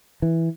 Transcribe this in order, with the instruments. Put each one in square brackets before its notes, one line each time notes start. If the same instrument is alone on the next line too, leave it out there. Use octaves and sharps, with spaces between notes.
[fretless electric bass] E3